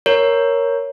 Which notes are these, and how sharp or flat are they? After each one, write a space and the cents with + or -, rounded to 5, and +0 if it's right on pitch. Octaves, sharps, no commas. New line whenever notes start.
A#4 +0 C#5 +0